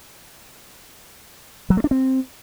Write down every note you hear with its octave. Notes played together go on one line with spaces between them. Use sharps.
F#3
A3
D4
C4